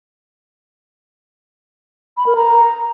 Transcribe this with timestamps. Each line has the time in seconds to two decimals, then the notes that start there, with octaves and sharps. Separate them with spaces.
2.17 B5
2.26 A#4
2.36 A#5